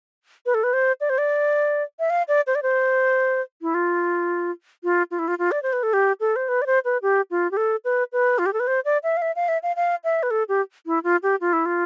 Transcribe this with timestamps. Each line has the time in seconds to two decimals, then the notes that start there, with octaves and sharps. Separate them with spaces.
0.46 B4
0.54 A4
0.64 B4
0.73 C5
1.01 D5
1.10 C5
1.18 D5
1.99 E5
2.10 F5
2.28 D5
2.47 C5
2.55 D5
2.63 C5
3.62 E4
3.74 F4
4.84 F4
5.11 F4
5.19 E4
5.28 F4
5.39 F4
5.52 D5
5.63 C5
5.73 B4
5.83 A4
5.93 G4
6.20 A4
6.36 C5
6.49 B4
6.62 D5
6.66 C5
6.85 B4
7.02 G4
7.31 F4
7.51 G4
7.57 A4
7.85 B4
8.12 B4
8.38 F4
8.46 G4
8.53 A4
8.60 B4
8.67 C5
8.85 D5
9.03 E5
9.17 F5
9.22 E5
9.36 F5
9.48 E5
9.63 F5
9.76 F5
10.04 E5
10.23 B4
10.31 A4
10.49 G4
10.86 E4
11.04 F4
11.23 G4
11.41 F4
11.53 E4
11.66 F4